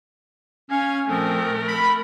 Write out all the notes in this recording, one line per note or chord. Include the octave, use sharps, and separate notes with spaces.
C#4 F5 G#6
A#2 F3 A3 C4 A#4
B5